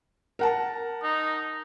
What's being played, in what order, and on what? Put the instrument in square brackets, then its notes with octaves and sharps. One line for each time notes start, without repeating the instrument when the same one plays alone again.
[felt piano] A#4 F#5 A5
[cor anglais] D#4